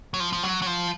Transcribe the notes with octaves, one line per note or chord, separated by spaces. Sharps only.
F#3
F3
F3
F#3
F#3
F3